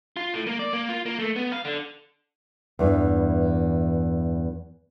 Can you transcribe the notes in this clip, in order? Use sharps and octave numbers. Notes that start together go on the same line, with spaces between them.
F4
A2
A#3
D5
A#3
F4
A#3
A3
B3
F5
D3
E2 G2 E3